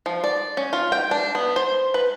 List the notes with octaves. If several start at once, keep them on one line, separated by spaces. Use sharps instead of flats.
F3
D5
C#4
F4
G5
D4
B3
C5
B4